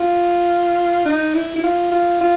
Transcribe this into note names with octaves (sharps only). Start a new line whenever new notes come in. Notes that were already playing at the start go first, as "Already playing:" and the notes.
Already playing: F4
D#4
E4
E4
F4
F4
F4